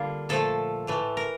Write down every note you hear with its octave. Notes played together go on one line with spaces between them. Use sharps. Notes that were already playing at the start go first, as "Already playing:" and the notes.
Already playing: D3 G3 A#3 F4
A#2 F3 A3 A4
A2 E3 A3
A#4